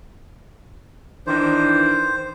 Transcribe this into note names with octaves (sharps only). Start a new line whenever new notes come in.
D#3 E3 D4 C5